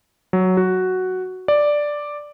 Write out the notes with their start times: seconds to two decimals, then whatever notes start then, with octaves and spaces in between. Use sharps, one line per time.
0.33 F#3
0.57 F#4
1.48 D5